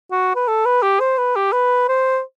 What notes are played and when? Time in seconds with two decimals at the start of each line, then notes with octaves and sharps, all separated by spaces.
0.12 F#4
0.36 B4
0.48 A4
0.65 B4
0.82 G4
1.00 C5
1.18 B4
1.36 G4
1.53 B4
1.88 C5